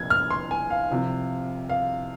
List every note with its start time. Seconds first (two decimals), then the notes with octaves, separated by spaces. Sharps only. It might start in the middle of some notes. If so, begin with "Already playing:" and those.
Already playing: C2 A#2 F3 G#6
0.10 F6
0.31 C6
0.51 G#5
0.70 F5
0.91 C2 C3 F3
1.69 F5